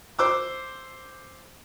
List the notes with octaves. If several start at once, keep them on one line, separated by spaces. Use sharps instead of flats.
C5 D6 E6